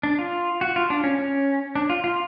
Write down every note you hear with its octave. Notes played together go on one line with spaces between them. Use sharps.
D4
F4
F#4
F4
D4
C#4
C#4
D4
F4
F4